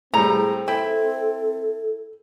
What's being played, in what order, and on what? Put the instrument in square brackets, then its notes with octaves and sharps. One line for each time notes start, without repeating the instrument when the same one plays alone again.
[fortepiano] A2 G3 [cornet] C4 [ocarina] G#4 [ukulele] A#5
[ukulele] E4 [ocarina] A4 [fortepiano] G5